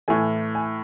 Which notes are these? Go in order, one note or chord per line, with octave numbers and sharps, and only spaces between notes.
A2 E3 A3 G#5
G#5